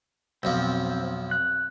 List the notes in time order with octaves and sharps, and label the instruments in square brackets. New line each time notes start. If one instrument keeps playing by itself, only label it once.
[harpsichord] B1 F2 F3 [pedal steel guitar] C4
[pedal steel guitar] F#6